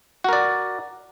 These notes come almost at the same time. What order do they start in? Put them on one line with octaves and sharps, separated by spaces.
F#4 A#4 D5